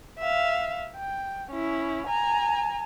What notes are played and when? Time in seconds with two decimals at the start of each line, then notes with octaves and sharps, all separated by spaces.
0.19 E5 F5
0.96 G5
1.51 C#4 E4
2.07 G#5 A#5